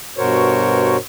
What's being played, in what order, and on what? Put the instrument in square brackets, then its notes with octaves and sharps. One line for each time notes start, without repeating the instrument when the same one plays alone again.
[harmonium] G2 B2 F#4 A#4 C5 C#5